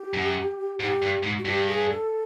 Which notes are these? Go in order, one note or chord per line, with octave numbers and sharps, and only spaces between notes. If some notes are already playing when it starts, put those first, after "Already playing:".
Already playing: G4
F#2
G#2 G4
G2
G#2
F#4
G2 G4
G#4
A4